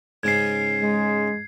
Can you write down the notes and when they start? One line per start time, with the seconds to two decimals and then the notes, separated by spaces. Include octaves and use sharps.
0.23 G#2 C#3 C#4 G#6 C7
0.81 G#3